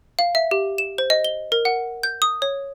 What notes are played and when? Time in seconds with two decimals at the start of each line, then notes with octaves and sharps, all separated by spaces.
0.19 F5
0.35 E5
0.51 G4
0.78 E7
0.98 C5
1.10 D#5
1.24 G7
1.52 A#4
1.65 F#5
2.03 G6
2.22 D#6
2.42 C#5